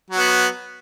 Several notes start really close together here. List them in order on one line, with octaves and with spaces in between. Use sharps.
F#3 F#4 B3